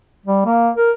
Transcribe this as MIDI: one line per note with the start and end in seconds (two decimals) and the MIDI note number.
0.26 0.42 55
0.46 0.70 58
0.77 0.91 70